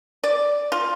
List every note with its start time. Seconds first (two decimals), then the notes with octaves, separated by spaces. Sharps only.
0.24 D5
0.72 F4